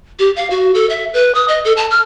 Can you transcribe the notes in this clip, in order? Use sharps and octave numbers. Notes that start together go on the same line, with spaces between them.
G4
F5
F#4
A4
E5
B4
D#6
D#5
A4
A5
F6